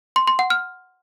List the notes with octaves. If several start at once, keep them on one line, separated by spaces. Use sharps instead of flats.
C6
C6
F#5
F6